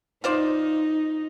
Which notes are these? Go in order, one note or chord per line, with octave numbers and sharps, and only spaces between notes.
D#4 F4 C5 D5